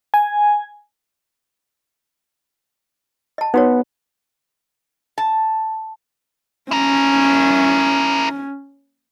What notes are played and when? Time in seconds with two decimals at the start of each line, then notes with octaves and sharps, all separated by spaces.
0.14 G#5
3.38 D#5 A5
3.54 B3 D#4 F#4 C#5
5.18 A5
6.71 C#4 E4 A#4